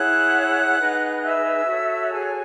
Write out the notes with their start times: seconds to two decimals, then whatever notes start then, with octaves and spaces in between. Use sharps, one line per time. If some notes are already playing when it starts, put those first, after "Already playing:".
Already playing: E4 G#4 C#5 F#5 F#6
0.78 D#4 G#4 B4
1.22 E5 E6
1.67 F#4 A4 C#5
2.11 G#4 G#5